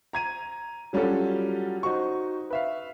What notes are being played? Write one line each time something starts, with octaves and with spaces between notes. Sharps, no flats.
A#5 G#6 D#7
F#3 G3 C#4 F4 F#4 A4
D#4 F#4 C5 C#6
B4 E5 F5